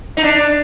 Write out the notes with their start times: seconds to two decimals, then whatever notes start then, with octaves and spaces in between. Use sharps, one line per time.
0.17 D#4
0.24 D4